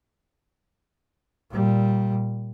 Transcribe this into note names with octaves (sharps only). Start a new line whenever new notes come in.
A#2 G3